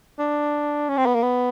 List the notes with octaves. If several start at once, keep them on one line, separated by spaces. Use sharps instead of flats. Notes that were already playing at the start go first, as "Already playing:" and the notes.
D4
C#4
C4
B3
A#3
B3